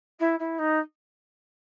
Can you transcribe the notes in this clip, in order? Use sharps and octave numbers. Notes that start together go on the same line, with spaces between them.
E4
E4
D#4